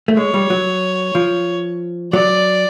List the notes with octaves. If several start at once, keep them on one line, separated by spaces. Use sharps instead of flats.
A3
G#3 C#5
G3
F#3
F3
F#3 D5